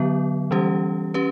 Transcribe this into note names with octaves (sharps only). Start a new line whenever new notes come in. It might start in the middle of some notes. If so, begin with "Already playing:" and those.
Already playing: D3 F#3 B3
E3 G3 C#4 G4
C#4 G4 B4